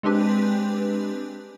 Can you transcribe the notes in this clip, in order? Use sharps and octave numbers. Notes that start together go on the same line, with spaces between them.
G#3 C4 D4 G4 B4